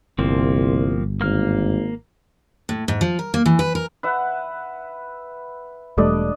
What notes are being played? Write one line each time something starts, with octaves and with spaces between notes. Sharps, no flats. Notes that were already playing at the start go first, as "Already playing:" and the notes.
G1 C2 F3 A#3 C4
G#1 A#3 F6
A2
G#2
F3
A#4
A#3
E3
B4
A#4
B4 E5 F#5
E1 G3 A3 D4 D5 D#5